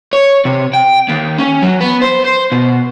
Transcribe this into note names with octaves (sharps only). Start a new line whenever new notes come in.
C#5
C3
G5
D#2
C#4
F#3
B3
C5
C5
B2